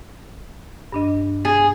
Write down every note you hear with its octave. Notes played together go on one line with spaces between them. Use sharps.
G2 D4 D#5
G#4